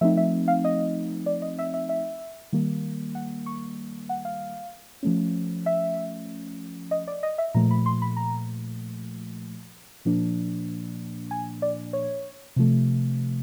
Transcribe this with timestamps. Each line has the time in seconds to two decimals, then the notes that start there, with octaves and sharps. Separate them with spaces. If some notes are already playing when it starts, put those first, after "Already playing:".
0.01 F3 A3 C4 D#4 E5
0.17 E5
0.48 F5
0.64 D#5
1.26 D5
1.42 D#5
1.59 E5
1.74 E5
1.89 E5
2.53 D#3 G3 A#3
3.15 F#5
3.46 C#6
4.09 F#5
4.25 F5
5.03 F3 A3 C#4
5.66 E5
6.91 D#5
7.07 D5
7.23 D#5
7.38 E5
7.55 A#2 F3 A3 A#5
7.71 B5
7.86 C6
8.02 B5
8.17 A#5
10.05 A#2 F3 A#3 D4
11.31 G#5
11.62 D5
11.93 C#5
12.56 C3 F3 A3